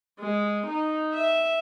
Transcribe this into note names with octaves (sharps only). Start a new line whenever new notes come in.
G#3
D#4
E5